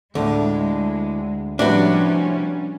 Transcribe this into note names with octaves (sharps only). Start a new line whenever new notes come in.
D2 A2 D3 G#3
A2 C3 F3 G3 C#4 D4 F#4 B4